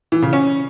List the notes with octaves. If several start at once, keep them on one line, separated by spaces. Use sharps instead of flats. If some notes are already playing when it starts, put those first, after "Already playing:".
E3
C#3
C#4